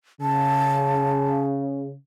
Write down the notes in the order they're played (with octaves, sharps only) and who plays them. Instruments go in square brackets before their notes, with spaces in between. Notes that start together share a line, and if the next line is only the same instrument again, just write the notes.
[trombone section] C#3 [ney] A5